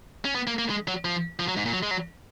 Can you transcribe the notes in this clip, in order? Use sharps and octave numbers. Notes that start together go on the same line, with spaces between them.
C#4
B3
A#3
A#3
G#3
F#3
F3
F3
F#3
G#2
A#2
F#3
G#3
F#3